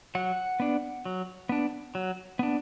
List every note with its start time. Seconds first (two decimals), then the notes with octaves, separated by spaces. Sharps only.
0.15 F#3 F#5
0.60 B3 D4
1.05 F#3
1.49 B3 D4
1.95 F#3
2.39 B3 D4